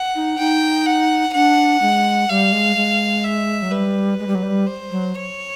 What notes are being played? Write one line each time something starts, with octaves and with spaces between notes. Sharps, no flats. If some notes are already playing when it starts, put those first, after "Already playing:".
Already playing: F#5
D#4
D#4 G5
F#5
D4 F#5
G#3
G3 F5
G#3
G#3
E5
F#3
G3 B4
G#3
G3
F#3
G3
C5
F#3
C#5